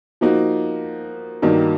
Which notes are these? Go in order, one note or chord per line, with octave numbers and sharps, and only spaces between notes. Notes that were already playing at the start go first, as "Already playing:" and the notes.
F3 A#3 D#4 F#4
G2 D#3 F#3 A#3 D#4